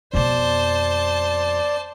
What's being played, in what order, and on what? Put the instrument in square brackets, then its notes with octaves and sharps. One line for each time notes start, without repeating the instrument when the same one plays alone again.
[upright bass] F2 B2 [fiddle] C5 A5 [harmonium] D5